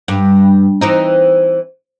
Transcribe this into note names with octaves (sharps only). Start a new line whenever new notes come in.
G2
E3 C4 D#4